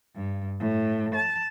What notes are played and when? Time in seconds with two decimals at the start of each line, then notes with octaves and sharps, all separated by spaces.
0.16 G2
0.58 A2
1.15 A5